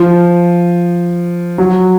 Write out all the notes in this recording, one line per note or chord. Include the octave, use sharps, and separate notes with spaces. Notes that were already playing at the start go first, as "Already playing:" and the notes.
Already playing: F3
F#3